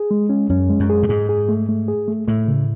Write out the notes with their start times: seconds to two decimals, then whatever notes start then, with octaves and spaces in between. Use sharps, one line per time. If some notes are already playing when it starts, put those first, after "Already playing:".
Already playing: G#4
0.11 G#3
0.29 C#4
0.50 F#2 C#4
0.69 G#3
0.80 F#2
0.90 G#4
1.03 A2
1.09 G#2 G#4
1.29 G#4
1.49 A3
1.69 A3
1.88 G#4
2.08 A3
2.28 A2 A3
2.48 C#3